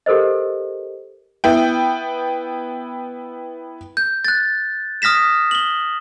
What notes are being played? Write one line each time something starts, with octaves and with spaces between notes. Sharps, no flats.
G4 A4 A#4 C5 D#5
B3 E4 G5
G6
F#6 A6
D#6 F6 A#6 B6 E7
F#7 G7